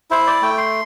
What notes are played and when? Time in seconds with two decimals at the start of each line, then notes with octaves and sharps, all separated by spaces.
0.11 E4 C5
0.27 D5
0.42 A3 G5
0.58 C6